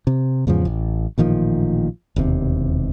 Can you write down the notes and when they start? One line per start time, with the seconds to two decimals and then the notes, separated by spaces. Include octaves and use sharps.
0.07 C3
0.47 E2 G#2 C#3 F3
0.65 A1
1.18 A1 A#2 D#3 F3
2.16 E1 D#2 C3